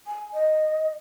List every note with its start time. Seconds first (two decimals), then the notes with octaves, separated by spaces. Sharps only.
0.07 G#5
0.33 D#5